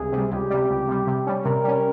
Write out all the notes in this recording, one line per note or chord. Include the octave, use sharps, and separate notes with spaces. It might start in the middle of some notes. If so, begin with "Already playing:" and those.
Already playing: C#2 C3 G3 G#4
C3
G3
C#2 G4
C3 G3
C#2
C3 G3
C3
G3 C#4
C3 A#4
G3 C#4